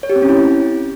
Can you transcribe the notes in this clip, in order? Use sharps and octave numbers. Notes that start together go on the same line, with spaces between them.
C#5
G4
C4
C#4
E4